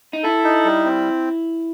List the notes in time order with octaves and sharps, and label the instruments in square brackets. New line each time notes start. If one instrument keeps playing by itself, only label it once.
[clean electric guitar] D#4
[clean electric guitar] E4 [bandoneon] A4
[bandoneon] D#4
G3
C4